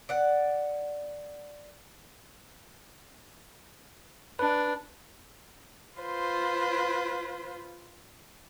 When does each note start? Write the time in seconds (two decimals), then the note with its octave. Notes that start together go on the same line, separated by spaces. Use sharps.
0.09 D5 F#5
4.39 D4 B4
5.99 F4 B4 C5